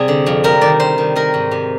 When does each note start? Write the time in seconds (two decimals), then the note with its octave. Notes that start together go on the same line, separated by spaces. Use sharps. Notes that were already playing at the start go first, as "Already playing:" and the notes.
Already playing: C3 G3 G#4
0.08 D3
0.26 F2
0.44 G3 A#4
0.61 D#3 D5
0.80 G3 C5
0.98 D#3
1.16 D#3 A#4
1.34 G#2
1.51 C3